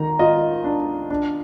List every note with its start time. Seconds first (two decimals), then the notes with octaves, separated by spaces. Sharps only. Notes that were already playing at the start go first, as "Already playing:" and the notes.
Already playing: D#3 A#5
0.19 F4 D#5
0.64 D4
1.10 D4